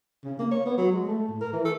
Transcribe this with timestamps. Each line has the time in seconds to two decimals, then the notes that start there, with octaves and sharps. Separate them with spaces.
0.24 C#3
0.39 A#3
0.51 C#5
0.66 B3
0.78 F#3
0.92 G#3
1.07 A3
1.28 A2
1.41 A#4
1.53 E3
1.65 A4